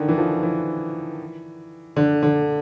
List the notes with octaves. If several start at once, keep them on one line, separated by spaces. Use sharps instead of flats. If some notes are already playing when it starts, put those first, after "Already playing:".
Already playing: D3 D#3
E3
F3
E3
D3
D3